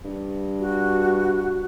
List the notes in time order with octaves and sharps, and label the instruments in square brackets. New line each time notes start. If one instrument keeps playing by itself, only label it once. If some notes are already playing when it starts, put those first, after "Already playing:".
[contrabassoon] G2
[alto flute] F#4